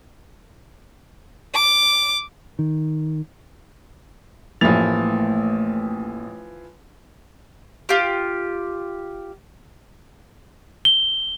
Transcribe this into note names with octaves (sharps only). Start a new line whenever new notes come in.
D6
D#3
A1 E3 F3 A3 A#3 A6 F7
F4 G4
G7